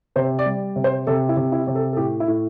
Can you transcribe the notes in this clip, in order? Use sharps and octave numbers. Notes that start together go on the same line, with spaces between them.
C3 C5
D5
G3
C3
C5
C3 A4
E4
C3
E4
C3
A4
A4
A2 G4
E4
A2